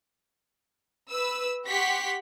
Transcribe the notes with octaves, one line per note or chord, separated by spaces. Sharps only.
B4 E6
G4 F#5 C6 C#6 B6